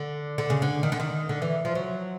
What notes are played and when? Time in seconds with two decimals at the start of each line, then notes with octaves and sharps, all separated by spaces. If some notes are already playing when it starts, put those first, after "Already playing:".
Already playing: D3
0.38 D3
0.50 C#3
0.62 D3
0.83 D#3
0.92 D3
1.00 D#3
1.29 D3
1.42 E3
1.65 F3
1.75 F#3